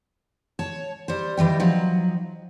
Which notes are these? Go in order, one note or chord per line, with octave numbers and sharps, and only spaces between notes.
C#5 A5
G3 C5
D#3 E3 G3 G5
F3 F#3 D#4